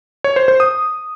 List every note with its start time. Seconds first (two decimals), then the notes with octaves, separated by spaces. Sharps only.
0.24 C#5
0.36 C5
0.48 C5
0.60 D#6